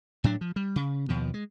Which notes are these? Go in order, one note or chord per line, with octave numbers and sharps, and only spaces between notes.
A2 F#3 D4
F3
G3
C#3
D#2 B2 F3
G#3